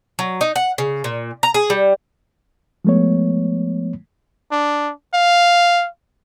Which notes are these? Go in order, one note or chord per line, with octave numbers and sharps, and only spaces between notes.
F#3
D#4
F#5
C#3
A#2
A#5
G#4
G3
F3 G#3 A3 B3 C#5
D4
F5